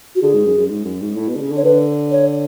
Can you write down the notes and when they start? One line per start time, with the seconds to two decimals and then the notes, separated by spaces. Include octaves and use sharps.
0.16 F#4
0.22 D3 G#4
0.34 G#2
0.46 F#2
0.57 F#2
0.70 G#2
0.85 F#2
1.02 G#2
1.16 A2
1.28 B2
1.36 D3
1.41 C#3
1.52 D3
1.57 C#5
1.64 D3 B4
2.11 C#5